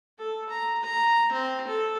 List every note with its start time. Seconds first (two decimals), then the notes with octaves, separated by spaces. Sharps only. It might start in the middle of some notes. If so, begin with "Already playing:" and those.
0.18 A4
0.49 A#5
0.83 A#5
1.32 C4
1.67 A4